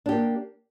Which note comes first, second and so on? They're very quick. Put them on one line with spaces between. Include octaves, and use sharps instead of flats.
D4 G4 A#3